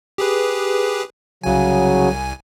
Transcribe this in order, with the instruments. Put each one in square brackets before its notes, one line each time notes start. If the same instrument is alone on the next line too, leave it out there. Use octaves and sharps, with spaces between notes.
[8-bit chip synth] G4 G#4 B4
[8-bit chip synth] C2 G#5 [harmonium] C#3 F#3